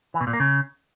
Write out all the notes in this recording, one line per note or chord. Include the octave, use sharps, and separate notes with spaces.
E3
B2
A#2
A#3
C#3